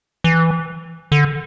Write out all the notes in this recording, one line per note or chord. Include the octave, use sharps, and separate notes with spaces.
E3
D3